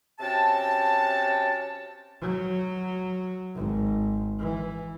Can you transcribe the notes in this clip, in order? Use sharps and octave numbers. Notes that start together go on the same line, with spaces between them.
C3 C#4 F#4 G5 A5
F#3
G#1
E3